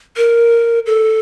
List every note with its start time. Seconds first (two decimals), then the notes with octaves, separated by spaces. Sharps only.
0.17 A#4
0.86 A4